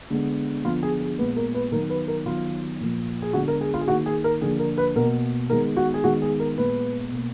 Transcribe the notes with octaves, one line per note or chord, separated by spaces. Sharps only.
D3 G#3 B3
D3 F3 B3 F4
G#4
G#4
A#2 G#3 B3 B4
A#4
B4
D#3 F#3 B3 A#4
B4
A#4
D#3 F#3 B3 F4
A#2 F3 A#3
G#4
D3 G#3 B3 F#4
A#4
G#4
F4
G#4
D#3 A#3 F#4
G#4
A#4
D3 F3 A#3 G#4
A#4
B4
B2 A#3 A#4
D#3 G#3 B3 A#4
F#4
G#4
D#3 G#3 B3 F#4
G#4
A#4
A#2 G#3 B3 B4
B2 A#3